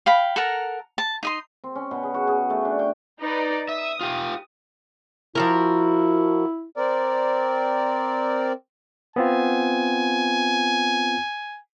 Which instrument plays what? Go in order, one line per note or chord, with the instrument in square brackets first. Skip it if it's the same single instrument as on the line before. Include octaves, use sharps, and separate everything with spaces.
[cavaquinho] F5 G5 B5
A4 A#4 F#5 A#5
A5
D#4 D#5 C6
[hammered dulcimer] C4
C#4
B2
G#4
F#4
G#4
A3
D4
G5
[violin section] D#4 B4 D5
[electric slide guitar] E5 [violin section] D#6
[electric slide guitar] F4 G4
[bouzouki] F3 F#4 A#4 [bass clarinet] E4
[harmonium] C4 A#4 D5
[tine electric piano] B3 C4 F4 [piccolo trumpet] G#5